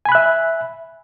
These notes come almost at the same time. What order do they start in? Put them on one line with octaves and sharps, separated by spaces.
G#5 B5 F#6 E5